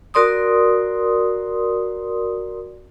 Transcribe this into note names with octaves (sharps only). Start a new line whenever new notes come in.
F#4 A#4 D5 C6 D#6